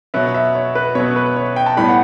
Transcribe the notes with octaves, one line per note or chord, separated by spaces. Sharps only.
B2 F#3 B3 E5
E5
C#5
B4
B2 F#3 B3 C#5
B4
C#5
G5
A5
A2 G3 B3 B5
F#5